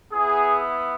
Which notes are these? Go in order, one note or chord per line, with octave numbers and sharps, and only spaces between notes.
B3 E4 G#4